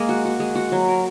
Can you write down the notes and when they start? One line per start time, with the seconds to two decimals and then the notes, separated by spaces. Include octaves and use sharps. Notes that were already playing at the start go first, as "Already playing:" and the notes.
Already playing: G#3 A#3 A#4
0.09 F#4
0.25 F#4
0.40 G#3
0.55 F#4
0.72 F#3
0.88 A#4